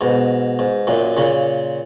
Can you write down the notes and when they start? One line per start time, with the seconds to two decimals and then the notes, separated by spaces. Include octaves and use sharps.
0.01 G#2 B2
0.59 G#2
0.87 F#2 A#2
1.17 A#2 C#3